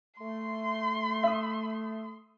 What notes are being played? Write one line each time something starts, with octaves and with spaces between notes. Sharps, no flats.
A3 C6
E5 D#6